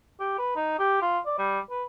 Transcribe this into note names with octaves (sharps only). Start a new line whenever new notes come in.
G4
B4
D#4
G4
F4
D5
G3
B4